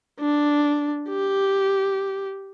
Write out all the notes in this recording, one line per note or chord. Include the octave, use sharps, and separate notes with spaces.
D4
G4